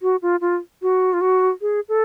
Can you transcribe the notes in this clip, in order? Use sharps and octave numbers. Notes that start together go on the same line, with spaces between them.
F#4
F4
F4
F#4
F4
F#4
G#4
A4